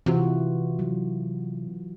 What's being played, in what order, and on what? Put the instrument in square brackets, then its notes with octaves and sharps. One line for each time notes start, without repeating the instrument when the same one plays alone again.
[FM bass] C3 [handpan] E3 F4 F#4
[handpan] F#3